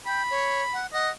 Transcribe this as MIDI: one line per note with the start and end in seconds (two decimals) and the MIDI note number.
0.06 0.23 79
0.06 0.79 83
0.31 0.63 73
0.73 0.87 78
0.94 1.10 75
0.94 1.11 78